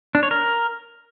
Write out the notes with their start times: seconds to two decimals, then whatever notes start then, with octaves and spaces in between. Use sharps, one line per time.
0.15 D4
0.23 C#5
0.31 A#4